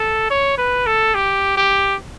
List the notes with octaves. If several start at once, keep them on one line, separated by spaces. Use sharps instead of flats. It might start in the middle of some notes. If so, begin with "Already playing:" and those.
Already playing: A4
C#5
B4
A4
G4
G4